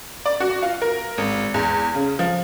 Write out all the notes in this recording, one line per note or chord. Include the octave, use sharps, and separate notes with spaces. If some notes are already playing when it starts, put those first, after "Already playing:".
D5
F#4
F4
A#4
G#1
E2
C#3
F3